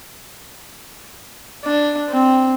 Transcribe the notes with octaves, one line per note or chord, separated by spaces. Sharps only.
D4
C4